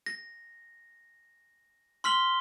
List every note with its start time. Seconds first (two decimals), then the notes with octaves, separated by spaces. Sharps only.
0.06 A#6
2.04 C6 F6 B6 F#7 G7